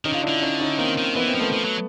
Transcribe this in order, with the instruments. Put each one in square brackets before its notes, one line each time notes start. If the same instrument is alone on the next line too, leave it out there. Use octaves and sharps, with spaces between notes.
[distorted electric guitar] D#3 [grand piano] C#4 D#4
[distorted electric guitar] D3 [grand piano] F4
[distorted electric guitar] D3 [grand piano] D4 E4
[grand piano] C#4 D#4
C#4 D#4
[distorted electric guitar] D#3 [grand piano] A#3 C4
[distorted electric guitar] D#3
[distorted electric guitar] E3 [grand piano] B3
[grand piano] C4
[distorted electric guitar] F3
[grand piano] A3 B3
[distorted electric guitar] F3
F#3